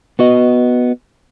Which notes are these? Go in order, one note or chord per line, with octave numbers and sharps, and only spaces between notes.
B3 F#4 D#5